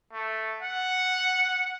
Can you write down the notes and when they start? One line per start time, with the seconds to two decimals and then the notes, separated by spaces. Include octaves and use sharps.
0.13 A3
0.62 F#5